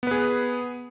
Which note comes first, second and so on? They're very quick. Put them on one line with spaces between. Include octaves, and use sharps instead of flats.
B3 B4 G#4